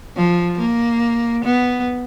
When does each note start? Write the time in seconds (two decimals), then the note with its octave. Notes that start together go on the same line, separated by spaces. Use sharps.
0.16 F3
0.59 A#3
1.44 B3